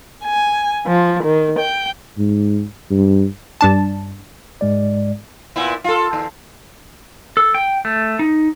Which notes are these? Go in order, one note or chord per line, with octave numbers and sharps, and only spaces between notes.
G#5
F3
D#3
G5
G#2
G2
G2 D4 A5
G#2 G#3 D5
A#2 B3 E4
F4 A4
D#2
A4
G5
A3
D#4